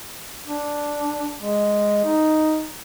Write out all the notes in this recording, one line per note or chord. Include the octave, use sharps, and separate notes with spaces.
D4
G#3
D#4